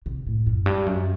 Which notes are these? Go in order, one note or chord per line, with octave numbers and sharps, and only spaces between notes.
C3
A2
F#2
G2
F#2